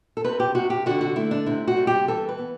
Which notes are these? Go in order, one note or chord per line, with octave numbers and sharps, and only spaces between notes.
A4
C3 B4
G4
C3 F#4
G4
D3 F#4
F#4
A3 E4
D4
C3 E4
F#4
G3
G4
E3 A4
B4
B3